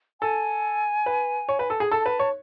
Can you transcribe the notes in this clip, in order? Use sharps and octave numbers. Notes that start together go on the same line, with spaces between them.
A4 G#5
B4
C#5
B4
A4
G#4
A4 A5
B4
C#5